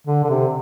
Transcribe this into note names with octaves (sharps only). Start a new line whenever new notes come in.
D3
D3
C3